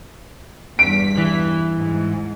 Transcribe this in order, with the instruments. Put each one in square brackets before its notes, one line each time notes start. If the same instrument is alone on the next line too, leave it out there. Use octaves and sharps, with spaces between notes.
[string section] E2 G2 B6 [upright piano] D7
[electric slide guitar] E3
[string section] G#2